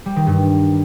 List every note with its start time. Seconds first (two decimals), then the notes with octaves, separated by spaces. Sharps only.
0.06 G3
0.16 D#3
0.27 G2